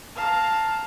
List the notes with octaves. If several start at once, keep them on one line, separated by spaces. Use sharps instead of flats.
F5 A5 A#5